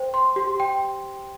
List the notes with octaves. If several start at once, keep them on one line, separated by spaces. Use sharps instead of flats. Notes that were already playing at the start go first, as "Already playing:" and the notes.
Already playing: C5 G5
C6
G4
G5